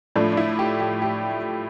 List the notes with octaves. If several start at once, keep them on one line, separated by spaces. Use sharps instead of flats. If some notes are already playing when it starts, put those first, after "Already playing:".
A2 F3 A3 D4
D4
E4
G4
G4
G4